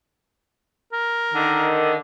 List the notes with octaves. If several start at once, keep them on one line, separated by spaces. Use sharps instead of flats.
A#4
D3 D#3